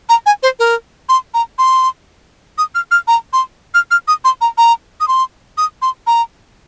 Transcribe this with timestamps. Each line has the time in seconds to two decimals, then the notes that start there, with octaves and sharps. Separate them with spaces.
0.09 A#5
0.26 G#5
0.43 C5
0.59 A#4
1.09 C6
1.34 A#5
1.58 C6
2.58 D#6
2.75 F6
2.91 F6
3.08 A#5
3.33 C6
3.74 F6
3.91 F6
4.08 D#6
4.25 C6
4.41 A#5
4.58 A#5
5.00 D#6
5.08 C6
5.58 D#6
5.82 C6
6.07 A#5